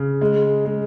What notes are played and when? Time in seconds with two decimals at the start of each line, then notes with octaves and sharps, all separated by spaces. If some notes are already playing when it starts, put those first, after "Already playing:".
Already playing: C#3
0.21 G#3
0.65 G#3